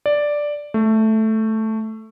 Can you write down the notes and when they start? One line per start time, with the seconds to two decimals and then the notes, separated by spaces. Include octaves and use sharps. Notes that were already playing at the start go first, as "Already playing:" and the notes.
0.06 D5
0.74 A3